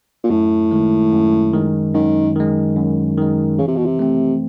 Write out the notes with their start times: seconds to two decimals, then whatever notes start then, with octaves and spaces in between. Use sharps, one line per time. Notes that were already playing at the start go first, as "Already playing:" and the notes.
0.24 A#2
0.30 F#2 A2
0.71 D#3 G#3
1.12 F#2
1.53 D#3 G#3
1.94 F#2 D#3
2.36 D#3 G#3
2.76 F#2
3.17 D#3 G#3
3.59 C#3 E3
3.68 C3
3.77 B2
3.86 C3
3.99 A3 C4